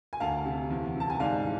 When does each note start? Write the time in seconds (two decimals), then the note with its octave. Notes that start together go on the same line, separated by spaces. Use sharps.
0.13 G#5
0.20 D2 F5 A5
0.45 C3
0.70 E2
0.95 C3 A5
1.10 G#5
1.20 G#2 D5 F5
1.45 E3